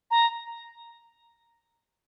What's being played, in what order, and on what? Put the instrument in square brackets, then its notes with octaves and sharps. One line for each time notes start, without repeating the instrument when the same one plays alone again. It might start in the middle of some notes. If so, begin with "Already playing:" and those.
[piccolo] A#5